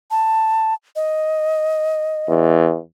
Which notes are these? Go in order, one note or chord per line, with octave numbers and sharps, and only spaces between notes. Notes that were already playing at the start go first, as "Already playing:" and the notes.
A5
D#5
E2